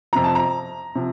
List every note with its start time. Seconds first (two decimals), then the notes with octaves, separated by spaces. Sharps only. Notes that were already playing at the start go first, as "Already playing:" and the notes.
0.13 F2 C3 F3 A#5
0.24 A5
0.35 A#5
0.95 C3 F3